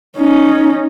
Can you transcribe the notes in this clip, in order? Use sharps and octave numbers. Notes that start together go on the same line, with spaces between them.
C#4 D#4